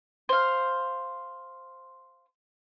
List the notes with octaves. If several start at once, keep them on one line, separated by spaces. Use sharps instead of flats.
C5 F5